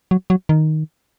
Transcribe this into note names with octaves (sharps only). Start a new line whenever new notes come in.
F#3
F#3
D#3